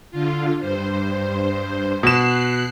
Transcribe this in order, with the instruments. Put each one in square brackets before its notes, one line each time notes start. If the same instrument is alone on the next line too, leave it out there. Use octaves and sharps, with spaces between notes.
[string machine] D3 F4
G2 C5
[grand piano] B2 E7 [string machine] F#6 C7